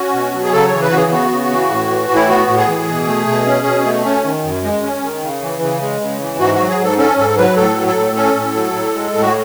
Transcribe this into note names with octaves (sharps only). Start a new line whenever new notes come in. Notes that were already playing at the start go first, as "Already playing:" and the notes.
Already playing: C#4 F#4
B2
F#3
G#4
C#3 A4
E3 C#5
B4
C#3 F#4
G#4
B3 F#4
C#3
E3
A2
E3
A2
E4
B3 F#4
A2
G#4
E3
B2
A3
B2
C#4
B2
A3
C#4
D#3
F#2
G#3
C#4
D#3
C#3
E3
C#3
G#3
C#3
E3
G#2 F#4
F#4
F#3
G#4
G#2 A4
C#4 A4
G#2 A4
F#3 B4
A2 A4
F#3
A4
A2
C#4 A4
A2
F#3
A2
G#3
A2
F#4